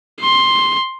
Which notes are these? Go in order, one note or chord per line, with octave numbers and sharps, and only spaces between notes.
C6